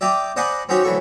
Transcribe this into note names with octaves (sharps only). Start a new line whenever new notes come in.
D5 E5 G5 A#5 D6 D#6
C5 D5 D#5 F#5 G#5 B5
C4 C#4 D#4 F#4 G4 C#5
D2 E3 F#3 A4 C#6